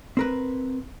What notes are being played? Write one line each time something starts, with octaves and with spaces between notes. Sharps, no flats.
C4 A#4 B4